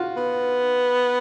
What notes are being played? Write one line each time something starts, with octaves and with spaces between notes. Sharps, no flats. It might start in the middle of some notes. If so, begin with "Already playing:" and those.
Already playing: F4 F#4
B3